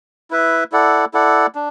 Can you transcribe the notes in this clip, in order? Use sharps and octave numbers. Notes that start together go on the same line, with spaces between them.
E4 B4 E5
E4 A4 D5 F#5
E4 A4 D5 F#5
D4